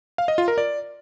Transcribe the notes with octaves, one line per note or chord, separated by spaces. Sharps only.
F5
D#5
F4
A#4
D5